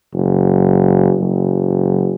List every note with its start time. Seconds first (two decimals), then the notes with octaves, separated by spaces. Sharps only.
0.14 F#1
1.19 F#1